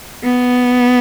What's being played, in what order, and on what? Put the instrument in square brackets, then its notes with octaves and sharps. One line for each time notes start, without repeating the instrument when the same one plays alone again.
[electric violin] B3